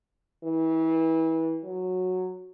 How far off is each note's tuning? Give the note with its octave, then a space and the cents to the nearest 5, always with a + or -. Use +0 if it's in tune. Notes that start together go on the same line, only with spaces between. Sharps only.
E3 -30
F#3 -10